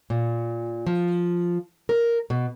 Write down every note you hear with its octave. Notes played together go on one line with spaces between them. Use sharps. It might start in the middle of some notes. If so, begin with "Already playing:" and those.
A#2
F3
A#4
B2